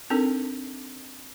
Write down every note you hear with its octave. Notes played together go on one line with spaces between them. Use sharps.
C4 D4 D#4 A4 A#4